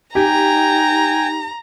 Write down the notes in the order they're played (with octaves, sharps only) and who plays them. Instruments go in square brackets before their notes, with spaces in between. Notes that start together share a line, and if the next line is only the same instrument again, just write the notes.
[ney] D#4 [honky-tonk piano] G4 [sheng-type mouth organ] G5 G#5 [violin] A#5